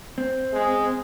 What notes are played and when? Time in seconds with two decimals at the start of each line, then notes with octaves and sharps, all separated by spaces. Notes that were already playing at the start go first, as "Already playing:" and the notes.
0.18 C4
0.53 G#3